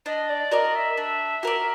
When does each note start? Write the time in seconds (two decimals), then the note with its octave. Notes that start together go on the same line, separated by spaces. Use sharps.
0.06 D4 D#5
0.29 D5
0.51 F#4 A#4 D5 D#5
0.75 E5
0.97 D4
1.43 F#4 A#4 D5